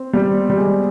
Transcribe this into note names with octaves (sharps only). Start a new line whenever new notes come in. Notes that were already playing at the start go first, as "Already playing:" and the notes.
Already playing: C4
G3
G3
G#3